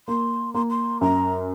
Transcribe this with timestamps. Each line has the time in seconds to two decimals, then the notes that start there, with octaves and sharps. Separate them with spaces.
0.08 A#3 C6
0.54 A#3 C6
0.70 C6
1.01 F#2 A#5